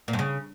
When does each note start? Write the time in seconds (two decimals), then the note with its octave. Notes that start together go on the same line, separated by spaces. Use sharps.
0.08 A#2
0.13 G2
0.19 C#3